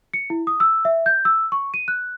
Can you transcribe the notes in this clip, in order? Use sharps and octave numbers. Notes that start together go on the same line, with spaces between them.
C#7
E4
D#6
E6
E5
G6
E6
C#6
D#7
F#6